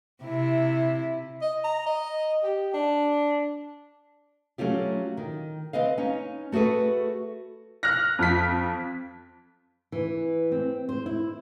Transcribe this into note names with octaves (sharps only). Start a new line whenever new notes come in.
C3 E4
D#5
A#5
D#5
G4
D4
F#3 A3 C#4 F4 G4
D#3
C4 B4 D#5 F5
C#4 D#4
A3 F#4 G#4 A4 B4
F6 F#6 A#6
F2 F4 B6
E3
C4
C5
E4